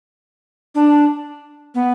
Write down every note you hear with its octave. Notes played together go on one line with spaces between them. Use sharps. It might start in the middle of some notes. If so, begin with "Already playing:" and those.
D4
B3